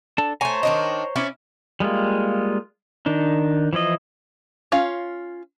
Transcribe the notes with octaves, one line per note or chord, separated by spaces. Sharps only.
D4 A4 A5
A3 C5 C#5 G#5 A#5
D#3 D4 D#5
C#4 E4 D5
G3 G#3 A#3 F4
D#3 D4 D#4
E3 F3 E4 D#5
C#4 F4 F5